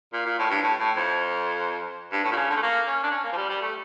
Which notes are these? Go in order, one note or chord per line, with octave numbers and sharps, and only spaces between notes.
A#2
A#2
A2
G2
A2
A2
F2
G2
A2
A#2
C#3
D3
A3
A#3
C#4
D4
C#4
A#3
F3
G3
G3
A3